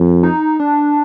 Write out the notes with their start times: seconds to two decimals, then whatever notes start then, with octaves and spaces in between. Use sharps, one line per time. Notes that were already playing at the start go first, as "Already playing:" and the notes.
Already playing: F2
0.23 D#4
0.60 D4